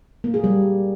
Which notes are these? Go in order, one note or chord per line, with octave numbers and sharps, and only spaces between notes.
A#3
G#4
G3